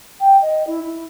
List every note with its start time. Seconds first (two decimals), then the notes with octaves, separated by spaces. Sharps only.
0.20 G5
0.41 D#5
0.67 E4
0.82 E4